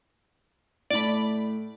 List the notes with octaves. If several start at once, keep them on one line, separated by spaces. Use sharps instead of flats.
A2 A3 D5 B5